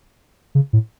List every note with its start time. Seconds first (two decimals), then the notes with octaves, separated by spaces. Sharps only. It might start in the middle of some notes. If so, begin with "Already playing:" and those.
0.55 C#3
0.73 A2